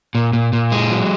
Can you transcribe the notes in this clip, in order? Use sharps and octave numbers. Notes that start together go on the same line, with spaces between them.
A#2
A#2
A#2
G#3
F#3